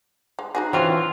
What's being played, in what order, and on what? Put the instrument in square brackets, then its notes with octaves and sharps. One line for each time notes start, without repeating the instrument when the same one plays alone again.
[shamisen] G#3
D#4 F#4 G#4
[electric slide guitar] E3 F4 [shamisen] C4 C#4 F#4